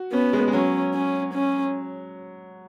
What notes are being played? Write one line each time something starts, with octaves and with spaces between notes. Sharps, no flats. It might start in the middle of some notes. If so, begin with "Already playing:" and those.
Already playing: F#4
B3 C#4
G#3
G#3
F#3 C#4
C#4
C#4